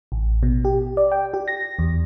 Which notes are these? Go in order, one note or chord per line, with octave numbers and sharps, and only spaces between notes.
A1
B2
G4
D5
G5
G4
A#6
E2